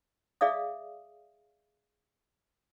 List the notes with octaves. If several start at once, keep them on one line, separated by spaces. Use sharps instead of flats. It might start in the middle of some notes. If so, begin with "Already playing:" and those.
G#4 D5 E5 F5 D#6